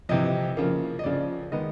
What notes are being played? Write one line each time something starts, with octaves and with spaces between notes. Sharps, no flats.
F2 C3 E3 D#5
C#3 F3 A#3
D#5
F2 C#3 F3 D5
D#3 G#3 B3 D#5